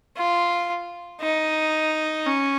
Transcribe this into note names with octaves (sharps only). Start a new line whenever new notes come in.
F4
D#4
C#4